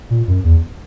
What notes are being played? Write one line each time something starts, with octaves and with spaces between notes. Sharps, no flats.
A#2
F#2
E2